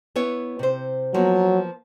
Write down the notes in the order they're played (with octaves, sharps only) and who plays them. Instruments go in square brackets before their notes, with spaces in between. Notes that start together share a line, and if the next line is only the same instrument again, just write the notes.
[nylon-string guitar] B3 E4 C#5
C3 C5
[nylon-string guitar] F3 A#3 B3 [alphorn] F#3